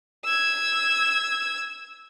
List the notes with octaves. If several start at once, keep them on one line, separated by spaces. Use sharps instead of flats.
E6 G#6